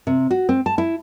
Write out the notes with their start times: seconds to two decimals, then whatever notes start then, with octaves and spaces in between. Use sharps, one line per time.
0.07 C3
0.31 F#4
0.49 C4
0.66 A5
0.78 E4